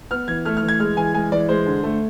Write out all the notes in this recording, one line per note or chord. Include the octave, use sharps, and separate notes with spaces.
B3 F6
E3 G#6
A3 F6
F6
E3
G#6
G#3 F6
E3 G#5
G#3 G#5
E3 D5
G#3 C5
D3
A3